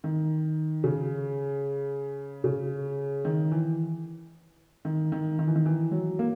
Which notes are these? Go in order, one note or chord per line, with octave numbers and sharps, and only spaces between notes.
D#3
C#3
C#3
D#3
E3
D#3
D#3
D#3
E3
D#3
E3
F#3
A#3